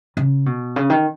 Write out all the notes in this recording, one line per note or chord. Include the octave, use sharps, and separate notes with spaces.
C#3
B2
C#3
D#3